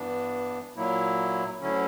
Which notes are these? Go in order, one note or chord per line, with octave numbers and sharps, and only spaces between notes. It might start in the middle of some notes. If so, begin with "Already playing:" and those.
Already playing: G2 E3 B3 D4
A#2 F#3 A#3 E4
D2 D3 F#3 C#4 E4